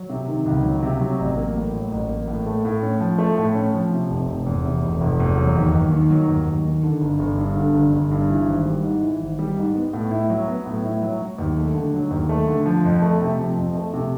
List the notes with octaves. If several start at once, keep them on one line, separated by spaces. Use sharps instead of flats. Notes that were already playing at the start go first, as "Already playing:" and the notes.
Already playing: F#3
C3
D#3
C#2
F#3
C3
F#3
A1
A#3
A2
F#3
A1
A#3
A2
A3
A2
C#4
F3
A3
A2
C#4
F3
C3
F1
F1
E2
C3
F1
F1
E2
F#3
D#2
D#2
D#3
F#3
D#2
D#2
D#3
D3
G1
G1
G2
D3
G1
G1
G2
E3
G#1
G3
G#2
E3
G#1
G3
G#2
B3
A2
E4
F#3
B3
A2
E4
F#3
F#3
D#2
A3
D3
F#3
D#2
A3
D3
F3
F2
A3
C3
F3
F2
A3
C3